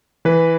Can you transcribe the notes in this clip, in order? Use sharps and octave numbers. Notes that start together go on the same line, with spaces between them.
E3 B4